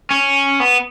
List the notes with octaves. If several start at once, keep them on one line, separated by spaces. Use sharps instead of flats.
C#4
B3